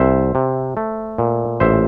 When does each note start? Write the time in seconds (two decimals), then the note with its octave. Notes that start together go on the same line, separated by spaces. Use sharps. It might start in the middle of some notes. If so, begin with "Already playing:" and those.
Already playing: C2 C5 E5
0.35 C3
0.77 A3
1.18 A#2
1.60 A1 C5 E5